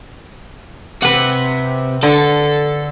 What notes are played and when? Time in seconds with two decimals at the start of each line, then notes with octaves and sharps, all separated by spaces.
1.02 C3 B4 F#5
2.03 D3 A4